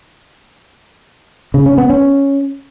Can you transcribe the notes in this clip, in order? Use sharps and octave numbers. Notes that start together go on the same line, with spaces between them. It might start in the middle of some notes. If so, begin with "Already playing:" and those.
C#3
C#4
B3
C#4